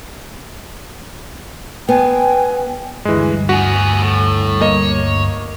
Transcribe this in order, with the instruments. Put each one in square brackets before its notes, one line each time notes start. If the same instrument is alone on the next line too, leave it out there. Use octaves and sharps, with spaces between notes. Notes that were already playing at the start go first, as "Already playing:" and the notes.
[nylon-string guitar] B3 [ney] G5 [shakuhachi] G#5
[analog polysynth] D2 G2 [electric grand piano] E3 G#3
[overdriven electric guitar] B3 G#4 [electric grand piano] F#4
[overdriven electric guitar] A2
[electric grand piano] A#3 D#5 [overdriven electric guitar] C#5